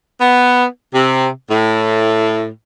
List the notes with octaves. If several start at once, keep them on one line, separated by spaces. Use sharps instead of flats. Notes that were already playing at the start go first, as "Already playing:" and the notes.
B3
C3
A2